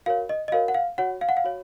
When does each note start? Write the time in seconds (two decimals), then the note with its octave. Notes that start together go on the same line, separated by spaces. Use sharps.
0.06 F#4 A#4 C#5 F5
0.29 D#5
0.48 D#5
0.52 F#4 A#4 C#5 F5
0.68 F#5
0.74 F5
0.98 F#4 C#5 F#5
1.21 F5
1.29 F#5
1.37 F5
1.44 F#4 C#5